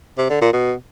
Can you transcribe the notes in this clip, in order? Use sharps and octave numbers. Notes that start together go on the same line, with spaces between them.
C3
D3
A#2
B2